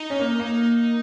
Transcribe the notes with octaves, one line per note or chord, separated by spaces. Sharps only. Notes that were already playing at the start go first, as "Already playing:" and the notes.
Already playing: D#4
C#4
A#3
A#3